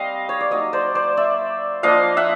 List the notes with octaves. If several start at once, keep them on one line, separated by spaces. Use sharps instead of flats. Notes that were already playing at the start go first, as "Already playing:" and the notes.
Already playing: G3 C4 D#5 F5
C#5
D5
F#3 A#3 D#4 C#5 D#5
C5 D5
C5 D5
D5 E5
F3 A#3 D4 D#5 F5
E5 F#5